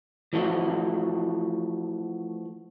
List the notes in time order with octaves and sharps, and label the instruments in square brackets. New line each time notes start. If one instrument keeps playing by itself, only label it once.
[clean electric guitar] E3 F3 A3 F#4